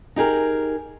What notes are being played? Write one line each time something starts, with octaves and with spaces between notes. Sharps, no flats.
D#4 G4 G#4 A#4